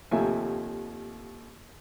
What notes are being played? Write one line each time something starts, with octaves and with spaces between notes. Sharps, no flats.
D#2 C3 F3 A3 E5 G#5